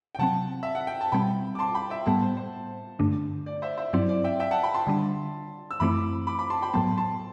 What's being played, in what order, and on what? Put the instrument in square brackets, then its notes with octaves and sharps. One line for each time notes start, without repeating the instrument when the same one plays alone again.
[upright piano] G5
[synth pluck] C3 F#3 C4 [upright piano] F#5 A5
[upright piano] E5
F#5
G5
A5
[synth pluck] B2 G3 C4 [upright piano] G5 B5
[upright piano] D6
A5 C6
G5 B5
E5 G5
[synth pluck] A2 G3 B3 [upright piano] F#5 A5
[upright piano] C5
C5
[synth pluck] G2 D3 A3 D4
[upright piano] D5
C5 E5
C5 E5
[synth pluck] G2 F#3 C4 E4 [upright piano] D5
[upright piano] D5
E5 G5
E5 G5
F#5 A5
G5 B5
A5 C6
[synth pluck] D3 G3 D4
[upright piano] E6
[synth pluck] F#2 E3 A3 C4 E4 [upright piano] B5 D6
[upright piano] B5 D6
B5 D6
A5 C6
G5 B5
[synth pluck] A2 F#3 B3 [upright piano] A5 C6
[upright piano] A5 C6